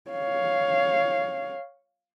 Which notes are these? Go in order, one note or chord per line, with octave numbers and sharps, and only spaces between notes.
C#5 F5